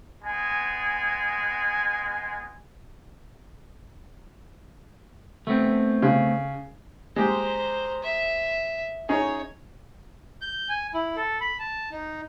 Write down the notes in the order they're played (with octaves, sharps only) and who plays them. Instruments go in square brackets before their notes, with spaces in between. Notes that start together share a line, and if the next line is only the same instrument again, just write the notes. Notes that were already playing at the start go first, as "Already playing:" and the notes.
[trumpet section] G#3 B3 G#5
[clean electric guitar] A3 B3 C4
[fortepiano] C#3
[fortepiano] G#3 G4 [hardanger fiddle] C5 A#5
[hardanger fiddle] E5
[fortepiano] C#4 D#4 G#4 [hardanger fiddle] C#5
[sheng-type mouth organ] G6
G#5
E4
A4
B5
A5
D#4